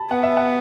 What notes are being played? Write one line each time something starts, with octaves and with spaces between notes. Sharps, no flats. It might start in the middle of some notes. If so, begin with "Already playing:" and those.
Already playing: A5 B5
B3 F#5
E5
F#5